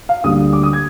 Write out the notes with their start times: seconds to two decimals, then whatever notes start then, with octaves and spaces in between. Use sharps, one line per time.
0.09 F5
0.24 D2 D3 G3 A#3 D#6
0.53 D6
0.63 D#6
0.73 G#6